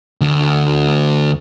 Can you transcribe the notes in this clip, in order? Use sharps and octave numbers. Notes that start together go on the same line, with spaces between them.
D2